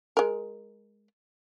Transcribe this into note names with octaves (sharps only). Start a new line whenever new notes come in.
G#3 A#4